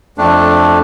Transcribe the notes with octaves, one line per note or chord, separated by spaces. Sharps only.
F2 A3 D4